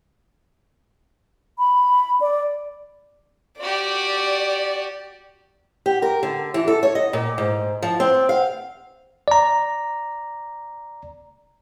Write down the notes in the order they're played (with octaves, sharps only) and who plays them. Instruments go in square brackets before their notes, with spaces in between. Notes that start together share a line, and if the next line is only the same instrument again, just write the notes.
[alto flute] B5
D5
[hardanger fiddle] F#4 G4 [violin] D5
[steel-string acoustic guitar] G4
A#4
D3
E3
A4
C#5
D#5
A#2
G#2
F3
C4
F5
[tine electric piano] D5 A#5